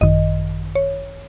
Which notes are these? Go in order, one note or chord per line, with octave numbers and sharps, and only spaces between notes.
G#1 F#2 D#3 D#5
C#5